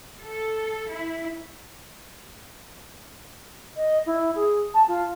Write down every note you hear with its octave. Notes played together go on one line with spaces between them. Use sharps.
A4
E4
D#5
E4
G#4
A5
F4